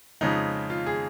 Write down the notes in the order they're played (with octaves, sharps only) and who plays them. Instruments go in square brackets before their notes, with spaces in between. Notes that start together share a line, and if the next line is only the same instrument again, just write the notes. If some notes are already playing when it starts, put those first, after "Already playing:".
[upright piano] F2 C#3 G#3 D#4
F4
G#4